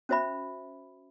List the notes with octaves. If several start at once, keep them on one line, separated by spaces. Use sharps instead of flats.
C#4 F#4 C5 E5 B5